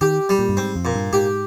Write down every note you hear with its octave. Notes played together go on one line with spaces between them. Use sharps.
D#3 G4
G3
A#2
G2
G#2 C4
F2
A#2
G2
G#2 G4